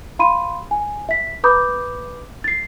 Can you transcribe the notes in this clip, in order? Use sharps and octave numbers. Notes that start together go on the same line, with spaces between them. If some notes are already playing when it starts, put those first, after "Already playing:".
F5 B5 C6 D#7
G#5
E5 B6
B4 A#5 B5 D6 D#6 G6
A6 C7